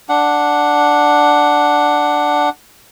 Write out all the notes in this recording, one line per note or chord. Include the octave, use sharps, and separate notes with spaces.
D4 F#5